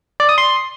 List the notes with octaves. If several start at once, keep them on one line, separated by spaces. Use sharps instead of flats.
D5
D#6
C6